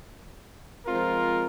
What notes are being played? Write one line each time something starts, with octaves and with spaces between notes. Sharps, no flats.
F3 G#3 C4 F4 A#4